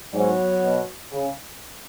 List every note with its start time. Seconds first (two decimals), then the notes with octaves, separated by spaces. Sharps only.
0.14 G#2 F#3 B3 F#4 C#5
0.63 B2
1.12 C#3